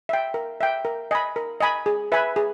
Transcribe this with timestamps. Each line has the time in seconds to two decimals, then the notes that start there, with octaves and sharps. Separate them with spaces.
0.09 E5 G5
0.34 A#4
0.61 E5 G5
0.85 A#4
1.11 D#5 G#5 B5
1.36 A#4
1.60 D#5 G#5 B5
1.86 G#4
2.12 B4 E5 G#5 B5
2.36 G#4